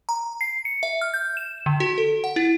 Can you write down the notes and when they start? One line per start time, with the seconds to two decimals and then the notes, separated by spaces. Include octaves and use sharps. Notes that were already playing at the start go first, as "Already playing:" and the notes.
0.09 A#5
0.41 C7
0.65 C#7
0.83 E5
1.01 F6
1.14 G6
1.37 E7
1.66 D3
1.80 F#4
1.98 A4
2.24 F#5
2.36 E4